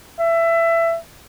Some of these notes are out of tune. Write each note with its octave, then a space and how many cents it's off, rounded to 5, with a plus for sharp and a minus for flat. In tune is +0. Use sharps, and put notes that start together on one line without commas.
E5 +20